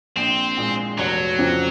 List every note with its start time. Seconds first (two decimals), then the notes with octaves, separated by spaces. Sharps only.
0.16 A#1 C4
0.57 A#2 G#3
0.98 F1 F#3
1.38 F2 C#3 F3 C4